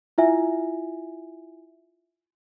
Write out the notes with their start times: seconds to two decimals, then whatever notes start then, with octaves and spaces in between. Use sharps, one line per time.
0.18 E4 F4 E5 G#5